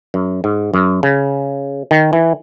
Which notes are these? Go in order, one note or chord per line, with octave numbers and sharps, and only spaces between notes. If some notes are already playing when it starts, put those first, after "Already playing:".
F#2
G#2
F#2
C#3
D#3
E3